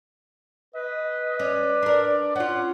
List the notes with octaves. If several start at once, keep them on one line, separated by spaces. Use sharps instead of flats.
B4 D#5
C#4 D5
D4 A#4
C#4 F4 F#5